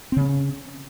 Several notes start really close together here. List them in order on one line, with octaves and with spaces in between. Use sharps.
C4 C#3 C#4